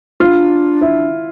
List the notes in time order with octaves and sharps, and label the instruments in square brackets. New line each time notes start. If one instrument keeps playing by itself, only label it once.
[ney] E4 [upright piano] F4
[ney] D4
[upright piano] E4